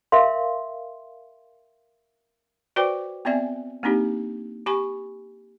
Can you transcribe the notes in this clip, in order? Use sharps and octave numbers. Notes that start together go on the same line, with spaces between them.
A#4 E5 F5 C6
F#4 B4 C5 D5 G5 D6
B3 C4 D5 E5 G#5
A#3 C4 D4 D#4 G4
G4 G#5 B5 C#6